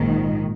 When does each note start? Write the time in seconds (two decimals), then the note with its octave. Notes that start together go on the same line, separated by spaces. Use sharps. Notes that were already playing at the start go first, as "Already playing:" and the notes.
Already playing: A#1 G#2 D#3